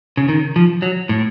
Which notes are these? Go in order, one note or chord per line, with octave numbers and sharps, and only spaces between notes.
C#3
D#3
F3
F#3
A2